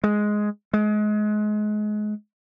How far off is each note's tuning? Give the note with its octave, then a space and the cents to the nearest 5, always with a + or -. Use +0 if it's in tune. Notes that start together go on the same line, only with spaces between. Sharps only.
G#3 +5
G#3 +30